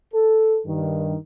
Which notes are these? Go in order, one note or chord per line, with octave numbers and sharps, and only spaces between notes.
A4
G2 D#3